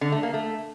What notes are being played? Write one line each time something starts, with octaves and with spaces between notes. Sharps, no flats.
D3
A3
A#3
A3